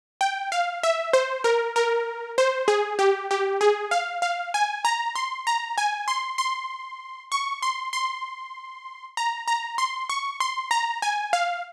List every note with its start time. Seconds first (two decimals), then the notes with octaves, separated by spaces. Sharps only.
0.21 G5
0.52 F5
0.83 E5
1.13 C5
1.44 A#4
1.76 A#4
2.38 C5
2.68 G#4
2.99 G4
3.31 G4
3.61 G#4
3.91 F5
4.22 F5
4.54 G#5
4.85 A#5
5.15 C6
5.47 A#5
5.78 G#5
6.08 C6
6.38 C6
7.32 C#6
7.62 C6
7.93 C6
9.17 A#5
9.48 A#5
9.78 C6
10.09 C#6
10.40 C6
10.71 A#5
11.02 G#5
11.33 F5